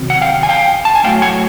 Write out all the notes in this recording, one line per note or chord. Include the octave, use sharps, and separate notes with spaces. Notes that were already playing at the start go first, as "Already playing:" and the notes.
Already playing: C3 D#3 F#3 C4
F#5
F5 G5
G#5
F5 G5
A5
G#5
A2 F#3 A3 F5 G5
F#5 G#5